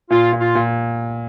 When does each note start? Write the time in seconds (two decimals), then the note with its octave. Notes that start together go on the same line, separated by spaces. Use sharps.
0.10 A#2 F4
0.33 A#2
0.40 F4
0.55 A#2